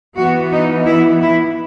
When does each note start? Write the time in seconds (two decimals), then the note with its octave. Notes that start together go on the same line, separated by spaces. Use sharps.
0.16 E3 B3 F#4
0.51 D#4
0.86 E4
1.21 E4